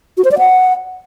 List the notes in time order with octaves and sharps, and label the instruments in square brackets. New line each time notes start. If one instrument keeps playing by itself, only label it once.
[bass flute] F#4
C5
D5
F#5